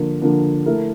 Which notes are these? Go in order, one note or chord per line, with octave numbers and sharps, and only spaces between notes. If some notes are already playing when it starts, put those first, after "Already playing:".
Already playing: D3 F3 A#3 D4
D3 F3 A#3 D4
A3 E4 A#4